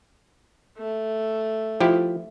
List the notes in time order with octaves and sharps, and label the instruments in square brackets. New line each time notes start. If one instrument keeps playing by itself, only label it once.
[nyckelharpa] A3
[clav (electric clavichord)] F3 E4 G4